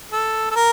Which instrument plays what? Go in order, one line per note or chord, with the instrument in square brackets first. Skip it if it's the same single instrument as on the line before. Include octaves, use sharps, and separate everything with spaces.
[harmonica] A4
A4
A#4